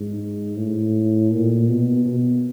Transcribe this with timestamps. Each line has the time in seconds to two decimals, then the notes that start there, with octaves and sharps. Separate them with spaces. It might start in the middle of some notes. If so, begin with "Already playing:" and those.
Already playing: G#2
0.56 A2
1.30 A#2
1.68 B2
2.05 B2